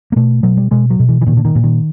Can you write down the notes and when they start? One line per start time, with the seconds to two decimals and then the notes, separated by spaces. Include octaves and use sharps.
0.12 A#3
0.16 B2 A3
0.43 B2 F#3
0.57 G3
0.71 B2 G#3
0.90 F#3
0.99 B2
1.09 E3
1.21 E3
1.26 A#2 D#3
1.37 D3
1.45 D#3
1.55 A#2
1.64 D#3